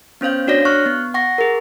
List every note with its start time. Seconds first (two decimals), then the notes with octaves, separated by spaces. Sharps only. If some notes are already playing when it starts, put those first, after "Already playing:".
0.21 B3 C#4 C5 F5 G6
0.47 D4 F#4 C#5 D5 A#6
0.65 C#6 F6 F#6
0.86 B3
1.14 F#5 C#6 A#6
1.38 G#4 A#4